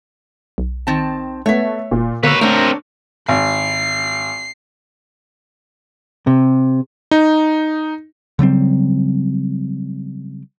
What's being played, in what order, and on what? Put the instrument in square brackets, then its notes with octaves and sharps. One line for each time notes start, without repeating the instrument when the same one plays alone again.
[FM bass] B1
[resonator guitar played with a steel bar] D#3 C4 A5
[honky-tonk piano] A3 B3 [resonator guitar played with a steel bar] C#5 E5
[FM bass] E1 [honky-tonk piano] A#2
[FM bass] D3 [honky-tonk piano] A#3 E6 [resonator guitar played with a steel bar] A#4 [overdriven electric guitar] B4 C#5
[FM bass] A3 [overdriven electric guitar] C4 A#4 [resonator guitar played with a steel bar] D4 C#5
[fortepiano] G#1 [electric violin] C7
[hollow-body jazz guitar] C3
[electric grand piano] D#4
[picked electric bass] C#3 F#3 G3 C4